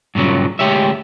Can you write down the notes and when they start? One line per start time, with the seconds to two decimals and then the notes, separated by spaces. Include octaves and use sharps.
0.15 G2 A#2 C#3 F#3
0.59 D2 G#3 G4 C#5 E5